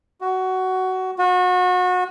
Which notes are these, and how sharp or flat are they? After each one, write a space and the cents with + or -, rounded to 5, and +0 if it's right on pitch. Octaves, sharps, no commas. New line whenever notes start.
F#4 +15
F#4 -30